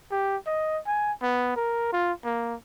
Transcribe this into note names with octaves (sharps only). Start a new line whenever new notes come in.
G4
D#5
G#5
B3
A#4
F4
A#3